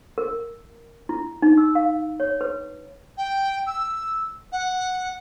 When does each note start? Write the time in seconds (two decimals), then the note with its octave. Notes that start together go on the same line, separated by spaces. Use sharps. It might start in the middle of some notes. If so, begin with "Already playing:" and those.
0.18 A#4
1.09 E4
1.42 D#4
1.58 E6
1.75 F5
2.20 C#5
2.41 B4
3.17 G5
3.67 E6
4.52 F#5